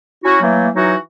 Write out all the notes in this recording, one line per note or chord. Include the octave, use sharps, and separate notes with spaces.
C#4 E4 F#4
E3 F#3 A3 A#3
E3 F#3 D#4 F#4